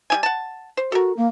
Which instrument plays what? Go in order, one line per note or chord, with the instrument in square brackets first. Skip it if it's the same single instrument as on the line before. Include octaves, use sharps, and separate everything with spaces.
[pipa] G3 E4 G#5
F#5 A5
C5
[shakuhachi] F#4 [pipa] A4 A#4
[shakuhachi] A#3